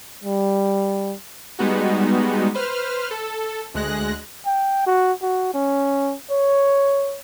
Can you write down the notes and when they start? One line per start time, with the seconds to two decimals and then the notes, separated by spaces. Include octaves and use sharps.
0.24 G3
1.59 G3 G#3 B3 D#4 F#4
2.54 B4 C5 F6
3.11 A4
3.74 D2 G#3 F#6 A#6
4.46 G5
4.86 F#4
5.22 F#4
5.54 C#4
6.30 C#5